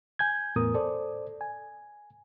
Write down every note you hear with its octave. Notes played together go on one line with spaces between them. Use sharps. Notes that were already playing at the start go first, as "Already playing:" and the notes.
G#5 G6 G#6
E2 A2 B3 A#4 D#6
A4 C5 D5
G#5